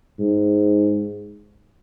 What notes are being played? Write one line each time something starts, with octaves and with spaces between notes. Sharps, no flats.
G#2